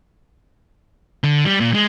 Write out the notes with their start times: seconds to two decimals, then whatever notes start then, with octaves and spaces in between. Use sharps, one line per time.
1.23 D3
1.45 G3
1.60 A#2
1.75 G#3